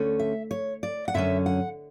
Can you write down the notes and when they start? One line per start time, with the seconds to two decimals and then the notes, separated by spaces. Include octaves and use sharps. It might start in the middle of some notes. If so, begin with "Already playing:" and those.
Already playing: D2 D3 A3 C#4
0.19 E5
0.51 C#5
0.83 D5
1.08 F#5
1.14 F#2 D3 F#3 C#4 E5
1.46 F#5